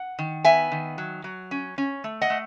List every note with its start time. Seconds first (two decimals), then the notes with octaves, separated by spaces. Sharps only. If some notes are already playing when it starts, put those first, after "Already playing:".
Already playing: F#5
0.19 D#3
0.45 B3 E5 G#5
0.72 D#3
0.98 F#3
1.24 F#3
1.51 C#4
1.78 C#4
2.04 A3
2.22 D#5 F#5
2.30 A3